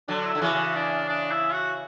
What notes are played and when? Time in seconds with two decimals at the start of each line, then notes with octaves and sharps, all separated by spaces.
0.08 D3 F#3 D4
0.25 E4
0.35 D3
0.41 C#3 E3 F#4
0.75 D4
1.09 D4
1.31 E4
1.53 F#4